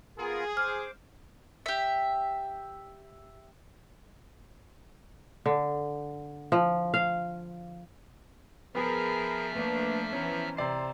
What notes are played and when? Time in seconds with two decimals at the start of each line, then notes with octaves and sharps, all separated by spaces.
0.18 B3 F4 G#4 A#4
0.57 C5 D6 F6
1.66 G4 E5
5.46 D3
6.52 F3
6.94 F5
8.75 F3 B3 G#4 A#4 E5 B5 F6
9.54 A3 A#3 D4 B4
10.13 E3 B3 C#4 A#5
10.57 C3 C5 D5 A#5 C7